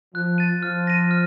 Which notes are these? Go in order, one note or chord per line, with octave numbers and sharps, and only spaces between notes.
F3 F#6
A6 D#7
F3 F6
A#6 D#7
F6